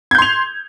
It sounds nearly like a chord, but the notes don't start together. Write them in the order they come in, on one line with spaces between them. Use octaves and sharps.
G#6 G6 C6 F7